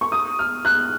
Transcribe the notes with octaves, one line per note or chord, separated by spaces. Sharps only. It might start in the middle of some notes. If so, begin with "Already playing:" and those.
C#6
D#6
F6
F#6